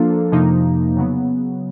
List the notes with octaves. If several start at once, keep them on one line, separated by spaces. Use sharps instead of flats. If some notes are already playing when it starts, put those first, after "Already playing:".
Already playing: F3 A#3 D4 F4 A4
F2 C3 F3 A#3 D#4
C#3 F#3 B3